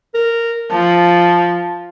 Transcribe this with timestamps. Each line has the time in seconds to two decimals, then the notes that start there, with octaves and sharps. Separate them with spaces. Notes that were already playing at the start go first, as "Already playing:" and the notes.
0.14 A#4
0.71 F3 A5